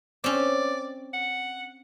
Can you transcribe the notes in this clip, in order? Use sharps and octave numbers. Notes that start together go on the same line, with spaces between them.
C4 C#4 D5
F#5